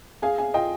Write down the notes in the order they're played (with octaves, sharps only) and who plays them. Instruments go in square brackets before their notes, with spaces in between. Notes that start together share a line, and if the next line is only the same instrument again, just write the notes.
[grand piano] G#4 [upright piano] F5 G#5
[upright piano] F5 G#5
[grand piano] F4 [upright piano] D#5 G5